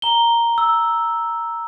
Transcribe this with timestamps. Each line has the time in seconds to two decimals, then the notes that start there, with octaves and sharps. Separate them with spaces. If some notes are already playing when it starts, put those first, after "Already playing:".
0.02 A#5 G7
0.58 E6